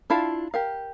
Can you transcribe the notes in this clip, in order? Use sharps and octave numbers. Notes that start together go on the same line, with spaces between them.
D4 E4 F4 F5 A5
G4 A#4 F5